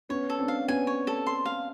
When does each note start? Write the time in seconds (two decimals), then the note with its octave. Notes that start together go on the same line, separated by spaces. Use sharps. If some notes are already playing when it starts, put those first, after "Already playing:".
0.09 B3 C#4 C#5
0.30 A4
0.39 C4 D4
0.48 F5
0.68 B3 C#4 G#5
0.87 C#5
1.07 A4
1.27 C6
1.46 F5